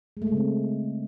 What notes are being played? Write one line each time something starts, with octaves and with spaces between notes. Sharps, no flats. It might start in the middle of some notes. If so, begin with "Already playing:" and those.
G#3
A3
G#3
C#3
C4